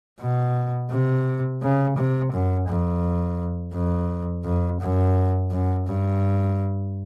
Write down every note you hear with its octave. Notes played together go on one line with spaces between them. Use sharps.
B2
C3
C#3
C3
F#2
F2
F2
F2
F#2
F#2
G2